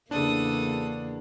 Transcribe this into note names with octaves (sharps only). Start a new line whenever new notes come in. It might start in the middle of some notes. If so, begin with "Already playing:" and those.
E2 C#3 A#3 D4 A4 D#6